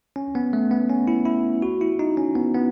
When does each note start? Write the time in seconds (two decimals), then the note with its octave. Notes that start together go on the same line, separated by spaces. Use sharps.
0.16 C#4
0.35 B3
0.53 A3
0.71 B3
0.90 C#4
1.08 E4
1.25 E4
1.62 F#4
1.81 E4
1.99 D#4
2.17 C#4
2.35 B3
2.54 B3